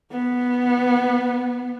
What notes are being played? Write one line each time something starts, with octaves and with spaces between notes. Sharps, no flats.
B3